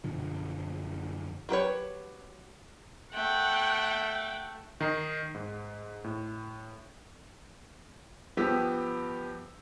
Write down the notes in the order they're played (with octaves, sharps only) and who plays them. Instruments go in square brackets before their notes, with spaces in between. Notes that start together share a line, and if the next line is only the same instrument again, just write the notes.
[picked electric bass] F#2 B2 D3 F3
[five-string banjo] F#3 G4 B4 C#5
[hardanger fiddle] A3 [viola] F#5 G5
[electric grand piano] D#3 D#5 A#5 C7
G#2
A2
[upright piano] G2 F3 B3 G4 E6 B6